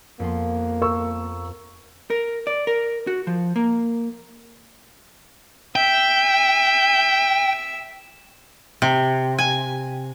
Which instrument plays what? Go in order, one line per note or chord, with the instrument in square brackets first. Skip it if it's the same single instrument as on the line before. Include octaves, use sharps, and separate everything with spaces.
[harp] F2 B3 C6 [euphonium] A#3
[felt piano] A#4 C#6 E6
[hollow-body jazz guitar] A#4
D5
A#4
F#4
F3
A#3
[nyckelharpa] E5 [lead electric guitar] G5
[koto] C3
G#5